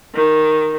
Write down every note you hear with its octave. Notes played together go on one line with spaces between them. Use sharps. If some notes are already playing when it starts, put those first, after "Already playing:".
D#3